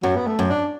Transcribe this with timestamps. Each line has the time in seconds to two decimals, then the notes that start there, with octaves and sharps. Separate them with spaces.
0.03 F#2 F#3
0.16 B3
0.27 A3
0.39 F#2
0.50 D4